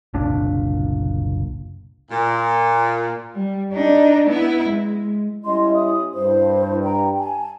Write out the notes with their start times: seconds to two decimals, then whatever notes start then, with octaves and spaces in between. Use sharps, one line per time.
0.14 F#1 C2 A#2 D4
2.09 A#2
3.34 G3
3.73 D4 D#4
4.29 B3 E4
4.69 G#3
5.45 G3 C#4 E4 D#5 C6
5.75 D#6
6.14 G2 E4 C5
6.84 G5 A#5
7.18 G#5 A5